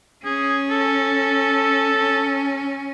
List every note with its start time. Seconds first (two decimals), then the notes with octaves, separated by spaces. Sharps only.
0.25 C#4 G#4
0.70 A4
1.97 C#4